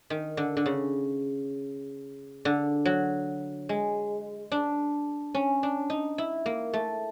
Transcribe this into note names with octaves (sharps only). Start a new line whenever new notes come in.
D#3
D3
D3
C#3
D3
F#3
G#3
D4
C#4
D4
D#4
E4
A#3
A3